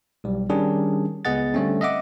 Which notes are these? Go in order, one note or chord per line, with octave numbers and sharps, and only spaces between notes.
B1 G3
D#3 G3 C#4 D4 G#4
C#2 B3 G#4 D#5 F#5 A6
D3 G3 A3 C4 C#4
D#5 E5 F#5 D6